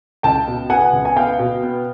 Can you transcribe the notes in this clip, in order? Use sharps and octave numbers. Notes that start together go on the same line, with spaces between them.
C#2 G5 A5
B2
B3 F#5 G#5
C#2
G#5
B3 F5 G5
B2
B3